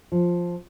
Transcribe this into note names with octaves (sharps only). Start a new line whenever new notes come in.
F3